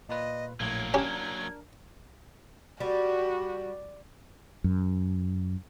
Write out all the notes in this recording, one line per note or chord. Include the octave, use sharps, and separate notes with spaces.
A#2 F4 B4 D#5
A#1 A2 F#3 A#3 G#6
C#4 D4 G4 A#4 G#6
G3 F#4
F#2